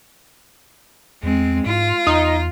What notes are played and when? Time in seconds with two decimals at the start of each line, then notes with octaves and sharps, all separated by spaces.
1.23 E2 G#3 C4
1.66 G#2 F4
2.07 E2 D#4